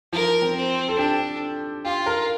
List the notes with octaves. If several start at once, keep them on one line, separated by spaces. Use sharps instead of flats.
F3 A#4
C4
C4
A4
D4 G4
F4 G4
A#4